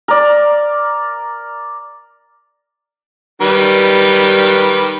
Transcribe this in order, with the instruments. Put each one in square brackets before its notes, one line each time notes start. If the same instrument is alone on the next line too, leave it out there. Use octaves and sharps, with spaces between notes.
[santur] A#4 D5
[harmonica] D#3 G3 B4